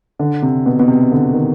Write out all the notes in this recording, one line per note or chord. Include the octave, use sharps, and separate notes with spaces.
D3
C3
B2
B2
C3
D3
D#3